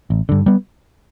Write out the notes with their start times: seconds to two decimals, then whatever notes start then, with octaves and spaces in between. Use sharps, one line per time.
0.10 A1
0.29 G2 D3
0.46 G3 B3